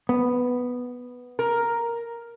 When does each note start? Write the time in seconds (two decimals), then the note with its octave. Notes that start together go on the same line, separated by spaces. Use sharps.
0.09 B3
1.39 A#4